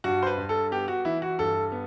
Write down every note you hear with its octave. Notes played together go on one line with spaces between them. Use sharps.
G2 F#4
C5
B4
G2
A4
B3 G4
F#4
E3 E4
F#4
G2 A4
B3